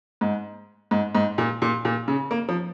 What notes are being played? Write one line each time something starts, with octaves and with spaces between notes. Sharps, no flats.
G#2
G#2
G#2
A#2
A#2
A#2
C#3
A#3
F3